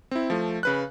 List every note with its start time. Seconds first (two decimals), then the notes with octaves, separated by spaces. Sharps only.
0.11 C4 E4
0.30 F3 A3
0.63 C#3 B4 F#6